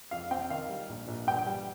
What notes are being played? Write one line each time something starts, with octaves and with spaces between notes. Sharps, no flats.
F2 F5
C4 G5
D#3 F5
G3
A#1
A#1
G2 G5
G3